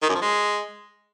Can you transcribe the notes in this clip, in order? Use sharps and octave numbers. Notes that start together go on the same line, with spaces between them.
D#3
F#2
F3
G#3